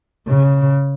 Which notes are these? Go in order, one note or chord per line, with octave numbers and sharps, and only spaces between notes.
C#3